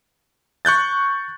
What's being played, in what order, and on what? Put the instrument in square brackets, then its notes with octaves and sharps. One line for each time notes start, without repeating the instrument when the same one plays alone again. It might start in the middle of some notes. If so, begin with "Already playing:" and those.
[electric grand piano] C#6 F#6 G6 A6